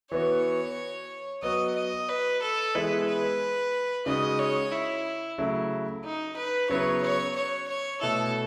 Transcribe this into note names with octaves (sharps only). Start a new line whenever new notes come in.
E3 B3 F#4 C#5
F#3 B3 F#4 D#5
D#5
B4
A4
E3 G#3 B3 E4 B4
B4
C#3 G#3 D#4 F#4 D#5
C#5
E4
C#3 F#3 A3 E4
D#4
B4
C#3 F#3 B3 E4 C#5
C#5
C#5
C#5
B2 A3 E4 A4